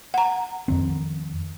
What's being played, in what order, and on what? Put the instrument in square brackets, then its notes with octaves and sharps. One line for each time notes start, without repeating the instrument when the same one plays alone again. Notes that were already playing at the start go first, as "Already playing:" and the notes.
[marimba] F#5 A#5
[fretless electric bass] F2 D#3 C4